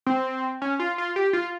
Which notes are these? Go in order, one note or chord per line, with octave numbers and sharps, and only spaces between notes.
C4
C#4
F4
F4
G4
F4